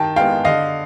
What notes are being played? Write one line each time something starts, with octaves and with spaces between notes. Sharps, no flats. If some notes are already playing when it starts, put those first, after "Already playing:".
Already playing: D#3 G5 A5
G#3 B3 F5 G5
D3 D#5 F5